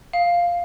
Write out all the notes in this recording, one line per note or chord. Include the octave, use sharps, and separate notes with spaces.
F5